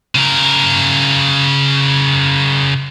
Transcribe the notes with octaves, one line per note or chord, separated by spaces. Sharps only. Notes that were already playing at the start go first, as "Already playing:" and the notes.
C#3 A#4